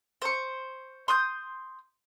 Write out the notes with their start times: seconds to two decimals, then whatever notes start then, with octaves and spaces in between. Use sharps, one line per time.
0.22 C5 C#6
1.08 C6 D#6 G6